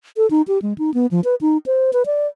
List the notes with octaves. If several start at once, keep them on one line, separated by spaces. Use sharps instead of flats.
A4
D#4
G4
G#3
D#4
B3
F3
B4
D#4
C5
B4
D5